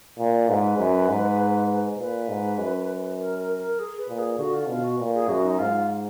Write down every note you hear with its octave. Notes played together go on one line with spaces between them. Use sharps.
A#2 D5
G#2 B4
F#2
G#2
A#2 B4
G#2
F#2
A#4
A#4
A#4
G#4
B4
A#2
G#4
D3 F#4
F4
B2 F4
F#4
A#2
G#4
F#2 F#4
D#4
G#2 F4